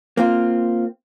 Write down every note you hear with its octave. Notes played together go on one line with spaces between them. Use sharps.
A#3 C4 F4